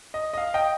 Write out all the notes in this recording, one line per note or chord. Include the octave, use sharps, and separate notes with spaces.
D#5
D#5
F5
D#5 G5